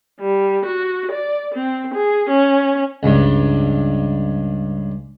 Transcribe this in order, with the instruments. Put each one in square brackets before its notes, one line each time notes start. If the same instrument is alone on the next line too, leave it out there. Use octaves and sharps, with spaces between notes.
[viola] G3
F#4
D5
C4
G#4
C#4
[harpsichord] C#2 G2